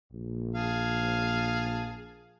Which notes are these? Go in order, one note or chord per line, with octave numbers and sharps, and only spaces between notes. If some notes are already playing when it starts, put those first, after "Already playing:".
A#1
G#4 F5 A5